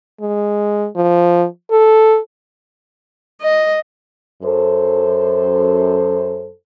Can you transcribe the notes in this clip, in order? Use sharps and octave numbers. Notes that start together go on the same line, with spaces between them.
G#3
F3
A4
D#5
F#2 A4 C5